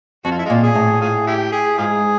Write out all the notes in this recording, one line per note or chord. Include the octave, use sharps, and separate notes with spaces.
F2 F#4
F4
E4
A#2 G#3 F4
G#4
A2
F4 G#4
E4 G4
G#4
G#2 F4 G#4